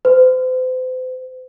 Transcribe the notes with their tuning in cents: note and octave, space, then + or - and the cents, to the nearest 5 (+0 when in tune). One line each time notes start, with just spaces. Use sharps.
C5 -40